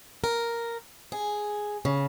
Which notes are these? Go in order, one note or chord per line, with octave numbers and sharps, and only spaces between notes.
A#4
G#4
C#3